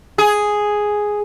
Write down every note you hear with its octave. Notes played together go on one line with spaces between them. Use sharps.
G#4